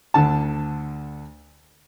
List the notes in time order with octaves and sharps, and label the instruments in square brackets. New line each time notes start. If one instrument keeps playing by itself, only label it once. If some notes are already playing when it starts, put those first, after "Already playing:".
[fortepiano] D2 D3 A5